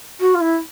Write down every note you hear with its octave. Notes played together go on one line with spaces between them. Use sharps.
F#4
F4
E4